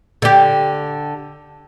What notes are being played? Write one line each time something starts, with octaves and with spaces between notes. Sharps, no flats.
D3 G4